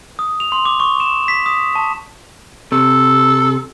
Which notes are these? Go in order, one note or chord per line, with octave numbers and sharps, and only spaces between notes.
D#6
F7
C6
D6
C#6
E7
B6
D#6
A5
C3 A4